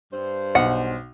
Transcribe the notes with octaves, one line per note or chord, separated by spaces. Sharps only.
G2 C5
B1 F#5